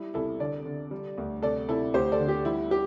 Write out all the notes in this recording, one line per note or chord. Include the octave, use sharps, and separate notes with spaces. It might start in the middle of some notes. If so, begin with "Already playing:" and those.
Already playing: G3 E4
C2 E4 A4
D3 A4 D5
D3
G3
D2
C3 A4 D5
C3 E4 A4
D2 G4 C5
A4 D5
D3
G4
G3 E4
G4